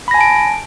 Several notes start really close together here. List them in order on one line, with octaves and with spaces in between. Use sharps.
B5 A#6 G#5 A5 D7